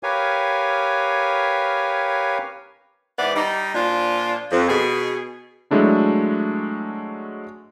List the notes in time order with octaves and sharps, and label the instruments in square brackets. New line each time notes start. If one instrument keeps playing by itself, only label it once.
[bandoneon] G4 A#4 B4 C#5 F5 G#5
[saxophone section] G#2 E3 B3 B4 D5
G3 D#4
A#2 F3 D4 F4
F2
B2 G#4
[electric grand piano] F#3 G#3 A3 D4 E4